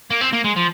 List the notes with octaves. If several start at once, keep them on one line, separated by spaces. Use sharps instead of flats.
A#3
C4
A#3
G#3
F3